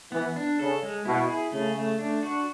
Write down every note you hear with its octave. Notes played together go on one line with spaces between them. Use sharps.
E3 B3
D4
C#3 A4
G#3
B2 E4
G#4
C#3 A3
A3
D4
F#4